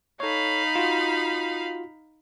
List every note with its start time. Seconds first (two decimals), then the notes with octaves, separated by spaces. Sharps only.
0.20 D#4 A4 C#5 F5 B5
0.76 F4 F#4